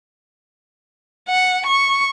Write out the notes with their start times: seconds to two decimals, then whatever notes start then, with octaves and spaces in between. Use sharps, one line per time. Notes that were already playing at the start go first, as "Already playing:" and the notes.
1.29 F#5
1.66 C#6